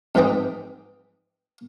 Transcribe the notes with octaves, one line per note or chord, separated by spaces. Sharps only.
F2 G#2 E3 B4 G5 D#6